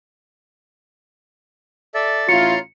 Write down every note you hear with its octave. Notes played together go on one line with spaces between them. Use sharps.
A4 D5 E5 A6
A1 E4 F4 C#5 A#5 C6 C#7